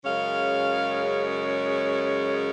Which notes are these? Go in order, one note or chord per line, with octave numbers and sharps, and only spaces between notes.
F#2 C#3 G#3 C#4 F5